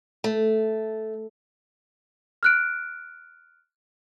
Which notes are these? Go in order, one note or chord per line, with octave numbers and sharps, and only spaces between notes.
A3
F6 F#6 D7